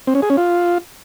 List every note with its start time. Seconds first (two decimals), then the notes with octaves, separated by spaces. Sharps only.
0.07 C4
0.15 C#4
0.22 G#4
0.30 C#4
0.37 F4